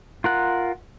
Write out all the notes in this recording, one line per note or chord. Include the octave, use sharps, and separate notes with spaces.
F4 A#4 F#5